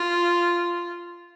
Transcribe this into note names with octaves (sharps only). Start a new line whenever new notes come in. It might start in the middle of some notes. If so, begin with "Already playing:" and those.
Already playing: F4